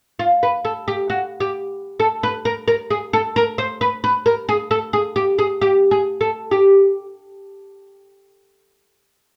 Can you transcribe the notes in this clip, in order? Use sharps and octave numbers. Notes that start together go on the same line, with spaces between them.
F4
B4
A4
G4
F#4
G4
A4
B4
A#4
A#4
G#4
A4
A#4
C5
B4
B4
A#4
G#4
A4
G#4
G4
G#4
G4
G#4
A4
G4